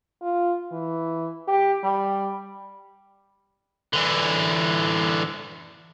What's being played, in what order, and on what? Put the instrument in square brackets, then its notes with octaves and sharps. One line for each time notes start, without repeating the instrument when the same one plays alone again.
[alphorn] F4
E3
G4
G3
[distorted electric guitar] D3 E3